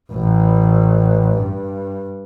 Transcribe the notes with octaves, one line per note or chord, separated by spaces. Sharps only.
A1
G2